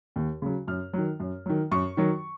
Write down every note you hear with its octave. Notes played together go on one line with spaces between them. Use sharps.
D#2
C#3 F#3
F#2 F6
D#3 F#3
F#2
D#3 F#3
F#2 C#6
D#3 F#3